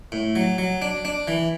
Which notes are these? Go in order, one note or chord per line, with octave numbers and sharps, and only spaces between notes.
A2
F#3
F#3
D4
D4
E3